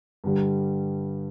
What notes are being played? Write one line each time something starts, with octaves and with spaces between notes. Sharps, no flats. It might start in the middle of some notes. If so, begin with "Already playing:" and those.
G2 D3 G3